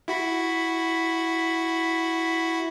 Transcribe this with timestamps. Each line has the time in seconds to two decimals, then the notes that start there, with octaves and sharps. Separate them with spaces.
0.08 E4 F#4 B5